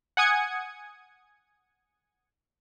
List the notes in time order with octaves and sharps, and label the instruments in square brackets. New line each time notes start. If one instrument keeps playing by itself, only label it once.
[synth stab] F#5 G#5 D#6 G#6 C#7